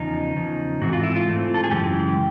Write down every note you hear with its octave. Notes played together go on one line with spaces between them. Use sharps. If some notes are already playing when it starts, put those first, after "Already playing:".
Already playing: E2 C#3 F3 D#4
E2 C#3 F3
G#2 E3 A3 C4 F#4
F4
E4
F4
G#2 E3 A3 C4
A4
G#4
F#2 C#3 E3 G#3 G4